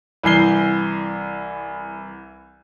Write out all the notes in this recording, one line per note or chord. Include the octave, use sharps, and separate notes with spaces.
C2 E3 C7 G7